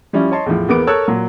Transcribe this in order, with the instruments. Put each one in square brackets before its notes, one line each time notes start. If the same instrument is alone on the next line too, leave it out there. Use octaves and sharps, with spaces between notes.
[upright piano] F3 G3 C#4 E4
C#5 D#5 A5 C6
E2 A2 F3
E2 A#3 B3 D6 D7
A4 A#4 C#5 A5 E6 F#6
A#2 F#3